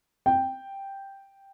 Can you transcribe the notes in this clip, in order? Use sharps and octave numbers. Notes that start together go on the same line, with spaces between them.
G5